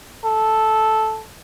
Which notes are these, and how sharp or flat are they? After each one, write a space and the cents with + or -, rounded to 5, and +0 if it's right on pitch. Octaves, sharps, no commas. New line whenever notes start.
A4 -5